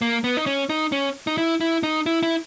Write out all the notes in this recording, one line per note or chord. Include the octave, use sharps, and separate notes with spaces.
A#3
B3
D#4
C#4
D#4
C#4
D#4
E4
E4
D#4
E4
E4